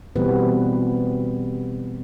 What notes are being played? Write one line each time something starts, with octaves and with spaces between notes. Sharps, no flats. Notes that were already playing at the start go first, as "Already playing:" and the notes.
B2 E3 G3 B3 C4 B4